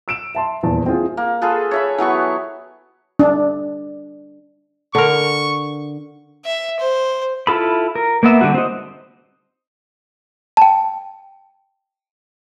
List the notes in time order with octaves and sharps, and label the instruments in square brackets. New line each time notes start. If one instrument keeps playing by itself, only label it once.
[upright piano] E6 D7 E7
E5 A5 C6
D#1 E2 E3 A5
C4 E4 F4 G#4
[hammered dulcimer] A#3
F4 G#4 A4 B4
C#5 E5 B5
E3 F#3 B3 C#6
[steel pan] D4
[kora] D3 A#4 [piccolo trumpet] C#6
[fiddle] E5
C5
[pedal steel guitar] E4 F4 A4 B5
A#4
A#3 B3 E5
D3 G3 F#4
C4 D#4
[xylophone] G5 A5